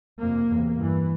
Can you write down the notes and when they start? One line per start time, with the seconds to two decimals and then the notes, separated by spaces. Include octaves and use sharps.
0.20 F2 C3 A#3
0.50 E2 C3
0.78 G2 E3